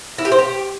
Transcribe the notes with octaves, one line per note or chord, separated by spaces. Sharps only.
E4
G4
C5
G4